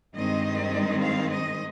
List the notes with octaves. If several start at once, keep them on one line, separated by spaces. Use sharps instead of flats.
G2 D#3 G#3 C4 D#5
F5
D#5